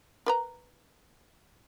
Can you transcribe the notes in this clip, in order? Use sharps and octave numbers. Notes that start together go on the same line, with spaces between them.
A#4 B4 A#5